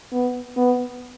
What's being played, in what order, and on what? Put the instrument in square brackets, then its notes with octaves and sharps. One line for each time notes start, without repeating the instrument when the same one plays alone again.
[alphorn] B3
B3